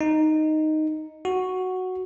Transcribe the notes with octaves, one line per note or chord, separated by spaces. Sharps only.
D#4
F#4